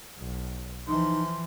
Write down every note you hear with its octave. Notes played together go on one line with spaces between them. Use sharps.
B1
E3 F3 D#4 C6